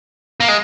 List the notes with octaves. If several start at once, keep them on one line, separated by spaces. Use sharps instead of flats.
A#3
G#3